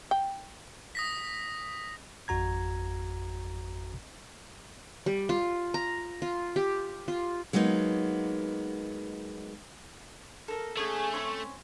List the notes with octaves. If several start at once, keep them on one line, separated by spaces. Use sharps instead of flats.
G5
D#6 A#6 B6
G#1 F2 F#4 A#5 G#6
G3
F4
A#5
F4
G4
F4
F#3 G#3 A#3 B3 D#4
A4 A#4
A3 B3 C#4 G#4
C4 C#4 C6